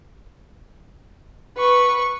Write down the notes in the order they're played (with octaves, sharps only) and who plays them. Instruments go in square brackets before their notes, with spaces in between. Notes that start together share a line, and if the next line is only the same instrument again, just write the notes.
[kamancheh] B4 C#6